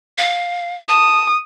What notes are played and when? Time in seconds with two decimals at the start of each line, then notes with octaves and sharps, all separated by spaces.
0.18 F5
0.89 A5 D#6